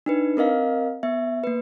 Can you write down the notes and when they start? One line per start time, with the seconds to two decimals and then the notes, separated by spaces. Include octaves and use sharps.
0.06 D4 D#4 B4
0.37 C4 A#4 D#5 F5
1.03 B3 E5
1.44 A#3 B4